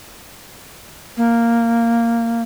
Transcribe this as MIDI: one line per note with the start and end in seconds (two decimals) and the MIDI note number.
1.17 2.43 58